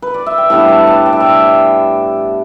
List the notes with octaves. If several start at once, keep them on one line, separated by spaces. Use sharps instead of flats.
B4
D5
E5
G5
A2 G3 B3 D4 A5
A5
A5
G5
E5
G5